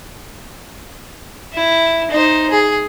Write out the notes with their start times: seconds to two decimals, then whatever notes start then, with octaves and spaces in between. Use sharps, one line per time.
1.53 E4
2.11 D#4 C5
2.50 G#4